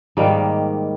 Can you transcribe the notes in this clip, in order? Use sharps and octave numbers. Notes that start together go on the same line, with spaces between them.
G#2 D#3 G3 A#3